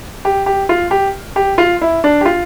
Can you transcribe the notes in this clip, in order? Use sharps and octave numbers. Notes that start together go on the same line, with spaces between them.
G4
G4
F4
G4
G4
F4
E4
D4
G4
F4